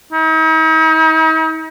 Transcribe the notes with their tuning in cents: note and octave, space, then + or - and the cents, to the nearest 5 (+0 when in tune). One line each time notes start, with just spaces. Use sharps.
D#4 +45